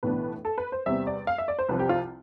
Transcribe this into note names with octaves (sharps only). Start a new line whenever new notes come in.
B1 A2 E3 B3 D4 B4
A4
B4
C5
E2 C3 G3 C4 E5
D5
F5
E5
D5
C5
C2 C3 F3 C4 B4
G4
F4